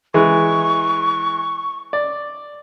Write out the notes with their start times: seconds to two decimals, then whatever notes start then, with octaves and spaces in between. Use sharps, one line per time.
0.14 E3 G#3 C#6
1.93 D5